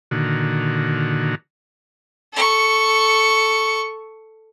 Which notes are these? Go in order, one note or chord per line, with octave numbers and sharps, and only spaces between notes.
A#2 D3 D#3 F#4
A4 C#6